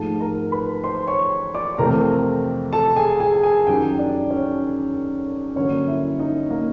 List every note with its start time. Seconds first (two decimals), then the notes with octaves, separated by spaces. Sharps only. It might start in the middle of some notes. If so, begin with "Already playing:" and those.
Already playing: G#2 F3 A3 A4 A5
0.20 A#4 A#5
0.52 B4 B5
0.84 C5 C6
1.07 C#5 C#6
1.55 D5 D6
1.78 F2 C3 E3 A3 C4 A#4 A#5
2.73 A4 A5
2.96 G#4 G#5
3.20 G#4 G#5
3.43 G#4 G#5
3.67 F#2 D#3 F#3 G4 G5
3.99 D4 D5
4.31 C#4 C#5
5.56 G2 D3 F#3 A#3 C#4 C#5
5.88 E4 E5
6.19 D#4 D#5
6.50 A#3 A#4